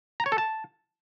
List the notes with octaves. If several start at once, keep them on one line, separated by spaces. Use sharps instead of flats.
A#5
C#5
A4
A5